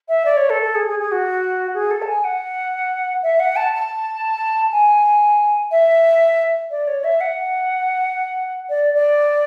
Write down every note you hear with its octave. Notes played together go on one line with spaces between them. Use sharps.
E5
D5
C#5
A4
A4
G#4
G#4
G#4
F#4
G#4
A4
A5
G#5
F#5
E5
F#5
A5
A5
G#5
E5
D5
C#5
E5
F#5
D5
D5